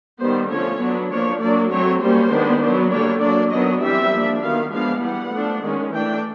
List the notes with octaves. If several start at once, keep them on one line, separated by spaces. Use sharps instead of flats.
D#3 G3 B3 C5
D3 F3 A3 C#4 C#5
F#3 B3 D4
F3 A#3 D4 C#5
F#3 A#3 D4 D5
F#3 A3 C4 C#5
G3 A#3 C#4 C5
D#3 G#3 B3 D4
F#3 B3 D4
D3 G3 A#3 D4 C#5
F#3 A#3 D4 D5
D#3 F#3 B3 D4 D#5
E3 G3 C4 E5
F3 A#3 D4
D#3 F#3 B3 F5
F3 G#3 B3 D4 F5
E3 G3 B3 F#5
F3 A3 D4
D#3 G#3 C#4
E3 A3 D4 G5